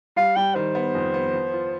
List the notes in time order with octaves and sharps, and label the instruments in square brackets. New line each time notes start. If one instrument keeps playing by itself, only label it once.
[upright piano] G3 [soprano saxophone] F5
[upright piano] G3 [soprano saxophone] G5
[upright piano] D#3 [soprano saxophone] C5
[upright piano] B3
F2
B3
F3
F4